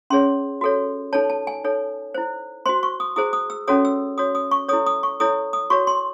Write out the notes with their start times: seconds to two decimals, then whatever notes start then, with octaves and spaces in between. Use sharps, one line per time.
0.10 C#4 G#4 C#5 C6
0.61 F#4 A4 C#5
1.13 D#4 A4 C#5 A5
1.30 A5
1.47 G#5
1.64 D#4 A4 C#5
2.15 E4 C5
2.66 F#4 C5 C6
2.83 C#6
3.00 D#6
3.16 E4 G#4 C5 D#6
3.33 D#6
3.50 E6
3.68 C#4 F#4 A4 C#5 D#6
3.85 E6
4.18 F#4 C#5 D#6
4.35 D#6
4.51 C#6
4.68 E4 A4 C#5 D#6
4.86 D#6
5.03 C#6
5.20 E4 A4 C#5 D#6
5.53 D#6
5.70 F#4 C#5 C#6
5.87 C6